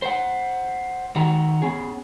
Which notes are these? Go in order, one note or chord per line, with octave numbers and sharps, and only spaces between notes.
C5 F#5
D#3 F#4 F#5 A#5
B3 C#4 G#4